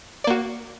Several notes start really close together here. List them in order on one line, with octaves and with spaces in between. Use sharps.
D5 A#3 F#4